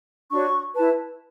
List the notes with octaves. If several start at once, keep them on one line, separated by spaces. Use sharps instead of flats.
D4 F#4 C#5 C#6
E4 B4 A5